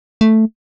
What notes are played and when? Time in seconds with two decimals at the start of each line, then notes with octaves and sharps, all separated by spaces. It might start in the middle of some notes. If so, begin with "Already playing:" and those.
0.21 A3